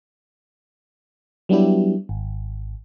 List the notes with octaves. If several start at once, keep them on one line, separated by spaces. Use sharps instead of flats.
F#3 G3 B3 D4 E4 G4
G#1